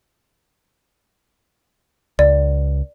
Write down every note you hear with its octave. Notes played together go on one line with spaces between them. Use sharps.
C#2 D5